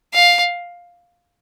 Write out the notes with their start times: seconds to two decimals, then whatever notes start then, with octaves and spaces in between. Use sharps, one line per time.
0.14 F5